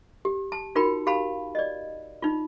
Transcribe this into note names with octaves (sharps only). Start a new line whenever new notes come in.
G4
A5
D#4 F4 F#4 A#4 G5 B5
G4 F5 A5 B5
D5 D#5
D#4 F4